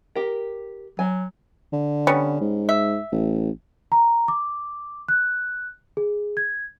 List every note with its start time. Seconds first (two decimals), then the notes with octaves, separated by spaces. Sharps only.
0.16 G4 A#4
0.99 F#3 G#5
1.72 D3
2.07 G3 B3 C#4
2.41 G#2
2.69 E5
3.12 A1
3.92 A#5
4.28 D6
5.09 F#6
5.97 G#4
6.37 G#6